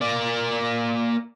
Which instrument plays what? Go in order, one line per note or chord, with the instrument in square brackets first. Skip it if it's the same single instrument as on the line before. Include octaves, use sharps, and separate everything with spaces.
[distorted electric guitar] A#3 D5